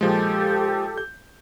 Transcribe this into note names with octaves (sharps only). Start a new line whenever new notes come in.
A#2 F3 G#3 G4 A4
G6